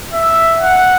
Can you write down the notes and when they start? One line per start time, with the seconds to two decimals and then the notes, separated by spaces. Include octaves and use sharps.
0.13 E5
0.60 F#5